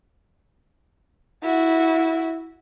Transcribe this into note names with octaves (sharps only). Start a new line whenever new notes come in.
E4 F#4